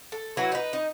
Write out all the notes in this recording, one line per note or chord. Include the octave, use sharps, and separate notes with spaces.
A4
F#3 E4 F#4 B4
D#4 B4
D#4